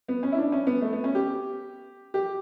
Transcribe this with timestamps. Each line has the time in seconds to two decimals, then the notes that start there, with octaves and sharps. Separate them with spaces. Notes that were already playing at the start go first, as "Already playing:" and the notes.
0.08 B3
0.23 C#4
0.32 E4
0.38 D4
0.52 C#4
0.67 B3
0.82 A3
0.93 B3
1.04 C#4
1.15 G4
2.14 G4